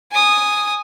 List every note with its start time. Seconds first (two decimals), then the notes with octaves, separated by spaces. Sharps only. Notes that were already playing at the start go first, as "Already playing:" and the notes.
0.12 G#5 D#6